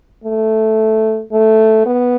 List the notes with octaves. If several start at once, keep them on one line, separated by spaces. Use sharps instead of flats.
A3
A3
B3